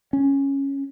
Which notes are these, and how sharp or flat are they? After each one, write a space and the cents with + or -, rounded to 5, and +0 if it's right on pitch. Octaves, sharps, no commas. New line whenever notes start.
C#4 -5